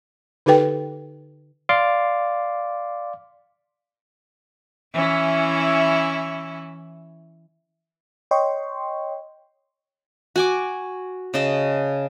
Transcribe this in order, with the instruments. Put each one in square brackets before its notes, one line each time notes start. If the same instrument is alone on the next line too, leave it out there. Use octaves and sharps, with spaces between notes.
[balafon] D3 D#4 G4 A4 B4 G5
[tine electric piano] D5 F5 C6 D6
[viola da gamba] E3 C#4 E4
[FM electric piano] C#5 D#5 G5 C6 C#6
[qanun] F#4 G#5 D6
C#3 D#5 A5